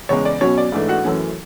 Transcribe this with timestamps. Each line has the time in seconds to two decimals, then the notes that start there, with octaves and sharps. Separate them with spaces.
0.09 E2 C#3 G#3 C#5
0.25 D5
0.41 B2 F#3 C#4 C#5
0.58 D5
0.72 G#2 E3 A3 D4
0.88 F#4 F#5
1.04 F#2 E3 A3 C#4